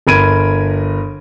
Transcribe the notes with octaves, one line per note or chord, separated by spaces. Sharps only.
G1 A#4 B5 G#6 D7 D#7